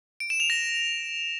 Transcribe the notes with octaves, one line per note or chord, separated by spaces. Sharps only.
D7
E7
F7
A#6